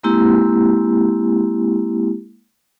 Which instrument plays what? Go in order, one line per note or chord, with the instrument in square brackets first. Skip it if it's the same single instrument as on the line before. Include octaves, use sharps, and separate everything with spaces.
[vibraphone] G#3 A#3 C4 E4 G4